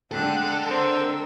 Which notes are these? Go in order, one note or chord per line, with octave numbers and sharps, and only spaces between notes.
D3 G#3 A4 G5 F#6
C4 A#4 E6